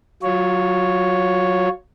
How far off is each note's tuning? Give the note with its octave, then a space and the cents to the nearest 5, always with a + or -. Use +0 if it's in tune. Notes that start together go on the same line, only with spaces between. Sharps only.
F#3 +0 F4 +20 C#5 +0